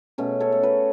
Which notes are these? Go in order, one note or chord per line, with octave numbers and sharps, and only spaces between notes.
B2 A3 C#4
A4 C#5
A3
F#4 B4